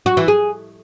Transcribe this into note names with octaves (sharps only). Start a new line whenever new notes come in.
F#4
E3
G#4